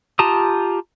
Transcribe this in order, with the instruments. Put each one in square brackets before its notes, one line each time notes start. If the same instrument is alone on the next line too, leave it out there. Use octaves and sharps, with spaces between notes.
[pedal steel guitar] F4 G4 A5 A#5 D#6